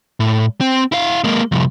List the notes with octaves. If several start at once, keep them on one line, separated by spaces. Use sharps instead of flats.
A2
C4
E4 F5
G#3 A#3
C2 F2